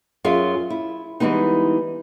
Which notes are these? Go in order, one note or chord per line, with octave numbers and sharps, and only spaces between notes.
F#2 F4 G#4 E5 F5
E4
E3 G3 G#3 B3 D#4